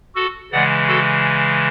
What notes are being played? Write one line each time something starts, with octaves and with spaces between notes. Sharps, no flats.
F#4 A4
C#3 E3 G#3 D5 F#5
F#4 A4